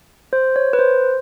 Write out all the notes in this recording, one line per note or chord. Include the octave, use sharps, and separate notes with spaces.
C5
C#5
B4
C5